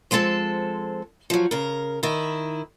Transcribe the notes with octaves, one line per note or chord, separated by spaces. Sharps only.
F3 G#3 C4 A4 A5
F3 F#3
C#3 A#4
D#3 E4